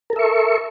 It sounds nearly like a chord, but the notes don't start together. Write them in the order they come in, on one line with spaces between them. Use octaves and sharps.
A#4 A4 E5 C#6